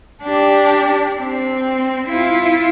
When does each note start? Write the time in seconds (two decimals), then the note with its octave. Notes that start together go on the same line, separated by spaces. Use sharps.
0.23 D4 G4
1.19 C4
2.08 E4 F4